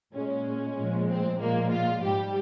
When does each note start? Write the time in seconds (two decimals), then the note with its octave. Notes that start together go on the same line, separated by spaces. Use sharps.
0.13 A#2 G#3 C#4
0.76 A#2 F3 G#3
1.09 C4
1.40 A#2 F3 G#3 A#3
1.71 F4
2.03 G#2 G3 G4